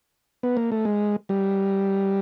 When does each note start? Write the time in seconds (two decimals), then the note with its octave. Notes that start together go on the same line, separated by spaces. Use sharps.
0.43 B3
0.57 A#3
0.72 A3
0.85 G#3
1.29 G3